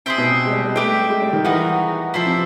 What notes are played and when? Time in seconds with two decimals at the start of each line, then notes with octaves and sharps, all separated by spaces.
0.06 C3 G#4 C5 E5 G5
0.18 B2
0.29 C3
0.46 G#3
0.52 G3
0.64 G#3
0.76 A3 G4 B4 E5 G5
1.10 G#3
1.22 G3
1.33 D#3
1.44 E3 B3 D#4 F#4 A#4
2.14 F3 E4 A4 C5 E5
2.26 C3